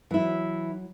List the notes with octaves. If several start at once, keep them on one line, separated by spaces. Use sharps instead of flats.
E3 F#3 E4